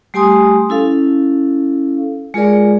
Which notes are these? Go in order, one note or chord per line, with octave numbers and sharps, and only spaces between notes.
G3 A3 G4 G#5 C6 D#6
C#4 E4 A4 F5
G#3 F4 G#4 A#4 D5